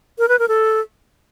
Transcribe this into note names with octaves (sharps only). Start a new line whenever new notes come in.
A#4
B4
A#4
A4